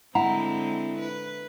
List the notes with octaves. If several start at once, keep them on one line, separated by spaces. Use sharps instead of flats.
D3 G#3 C4 E4 F#5 A#5
B4